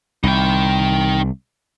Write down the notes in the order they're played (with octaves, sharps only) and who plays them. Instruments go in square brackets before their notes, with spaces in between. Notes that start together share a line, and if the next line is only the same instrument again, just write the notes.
[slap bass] C2 [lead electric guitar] D#4 G5